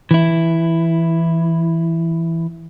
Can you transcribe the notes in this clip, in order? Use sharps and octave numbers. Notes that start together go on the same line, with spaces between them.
E3 E4